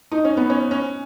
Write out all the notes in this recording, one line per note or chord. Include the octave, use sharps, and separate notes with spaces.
D#4
C#4
B3
C#4
C#4